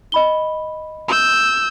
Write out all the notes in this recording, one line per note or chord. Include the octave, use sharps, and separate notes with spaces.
D#5 B5 G7
E6 G6